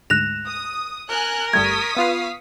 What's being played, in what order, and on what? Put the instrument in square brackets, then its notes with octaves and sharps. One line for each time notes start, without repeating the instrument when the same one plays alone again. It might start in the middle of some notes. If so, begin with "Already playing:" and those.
[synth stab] D2 G#2 E7 [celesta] F#6 A#6 F7
[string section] D#6
[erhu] A#4 [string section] G#5 F6 F#6
[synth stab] G1 G3 A3 [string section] C#6 D#6 B6 [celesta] G#6
[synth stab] B3 F4 B4 [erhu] F5